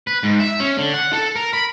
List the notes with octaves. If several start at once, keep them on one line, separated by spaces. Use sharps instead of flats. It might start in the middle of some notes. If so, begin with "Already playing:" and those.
B4
G#2
E5
C#4
D3
F#5
A4
A#4
B5